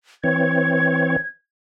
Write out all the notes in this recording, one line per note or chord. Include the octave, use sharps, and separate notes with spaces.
E3 C4 C#5 G#6